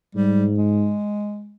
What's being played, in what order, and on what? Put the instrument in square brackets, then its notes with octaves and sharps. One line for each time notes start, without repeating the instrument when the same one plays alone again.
[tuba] G#2 [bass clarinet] G3
[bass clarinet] G#3